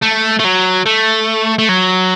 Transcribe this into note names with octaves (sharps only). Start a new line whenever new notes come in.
A3
A3
F#3
A3
A3
F#3